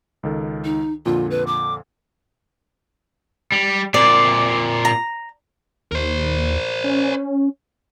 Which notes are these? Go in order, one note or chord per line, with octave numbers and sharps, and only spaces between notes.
C#2 D#3 A4
D#4
F2 A#2 D3 F4
B4
D6
G3
A#2 C4 D5
A#5
D#2 A#4 C5
C#4